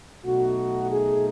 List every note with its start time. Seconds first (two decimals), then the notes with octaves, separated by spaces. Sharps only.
0.23 B1 B2 A3 D#4 F#4
0.90 G#4